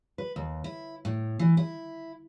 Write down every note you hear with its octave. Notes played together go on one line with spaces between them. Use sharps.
B4
D#2
E4
A2
E3
E4